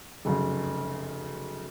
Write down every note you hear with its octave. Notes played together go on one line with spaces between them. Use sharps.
F1 F#2 C#3